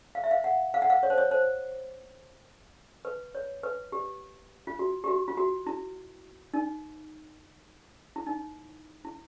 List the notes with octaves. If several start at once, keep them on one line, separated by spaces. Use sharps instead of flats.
F5
E5
F5
F#5
F5
F#5
F5
C#5
C5
C#5
C5
B4
C#5
B4
G4
F4
F#4
G4
F#4
F4
F#4
E4
D#4
E4
D#4
E4